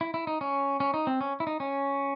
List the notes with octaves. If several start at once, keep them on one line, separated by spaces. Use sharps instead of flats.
E4
E4
D#4
C#4
C#4
D#4
C4
C#4
E4
D#4
C#4